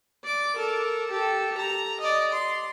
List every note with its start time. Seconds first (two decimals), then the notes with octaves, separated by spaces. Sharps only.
0.23 D5 D6
0.56 A4 A#4
1.10 G4 A4
1.57 A#5
2.00 D5 D#5
2.32 C6